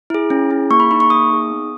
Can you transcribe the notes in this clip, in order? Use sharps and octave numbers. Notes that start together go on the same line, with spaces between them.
E4 G#4
C#4
E4 G#4
A#3 C#6
B5
D#4 G#4 B5
C#6
A#3 D#6
D#4 G#4
B3